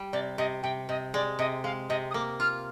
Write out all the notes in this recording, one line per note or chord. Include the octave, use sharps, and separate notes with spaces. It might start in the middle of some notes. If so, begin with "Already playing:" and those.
Already playing: G3
C3 D5
C3 D#5
C3 G5
C3 D#5
G#3 D5
C3 D#5
G#3 F5
C3 D#5
D#6
A#3 D6
F4 F6